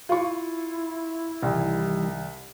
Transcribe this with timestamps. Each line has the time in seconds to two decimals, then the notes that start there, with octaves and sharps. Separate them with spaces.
0.09 E4 F4 C#6
1.43 C2 D#3 E3 G3